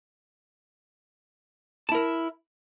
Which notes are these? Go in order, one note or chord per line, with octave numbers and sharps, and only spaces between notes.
E4 A#4 A5